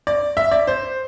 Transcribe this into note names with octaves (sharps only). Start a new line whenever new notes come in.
D5
E5
D5
C5